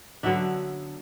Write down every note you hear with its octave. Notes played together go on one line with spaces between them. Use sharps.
D3 F#3 B3 D4 E5